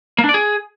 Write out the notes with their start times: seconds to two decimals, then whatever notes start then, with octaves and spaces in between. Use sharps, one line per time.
0.18 A#3
0.24 D4
0.29 D5
0.34 G#4